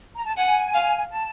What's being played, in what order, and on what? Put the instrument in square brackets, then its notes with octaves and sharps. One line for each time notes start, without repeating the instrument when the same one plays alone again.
[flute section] A#5
A5
[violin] F#5 [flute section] G#5
[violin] F5
[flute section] A5